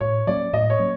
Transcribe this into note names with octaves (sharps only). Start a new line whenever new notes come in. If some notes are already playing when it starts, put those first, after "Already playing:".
A2 C#5
F#3 A#3 C#4 D5
A2 D#5
C#5
F#3 A#3 C#4